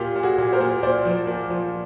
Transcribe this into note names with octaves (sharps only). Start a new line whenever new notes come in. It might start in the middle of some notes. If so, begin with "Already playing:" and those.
Already playing: A#2 F4 G4
A#2
F#4 G#4
A#2
A#4 C5
A#2
A#2 C5 D5
F3
A#2
F3